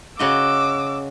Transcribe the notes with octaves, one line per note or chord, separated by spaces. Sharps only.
C#3 F#4 D#5 D6 E6